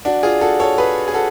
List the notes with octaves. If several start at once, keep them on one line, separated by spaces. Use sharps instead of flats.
D4 F#4
F4 G#4
F#4 A4
A4 C#5
G#4 B4
G#4
F#4 A4